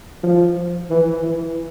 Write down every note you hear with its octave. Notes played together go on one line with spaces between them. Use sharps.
F3
E3
E3